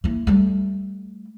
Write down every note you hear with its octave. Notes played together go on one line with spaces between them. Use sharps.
A#3 E4
G3 A3